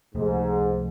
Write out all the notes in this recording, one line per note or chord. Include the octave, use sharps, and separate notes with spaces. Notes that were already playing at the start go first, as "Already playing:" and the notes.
C#2 G#2 C3 F3 A3